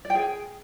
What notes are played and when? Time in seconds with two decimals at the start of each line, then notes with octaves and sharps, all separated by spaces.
0.05 D5
0.10 G5
0.15 G#4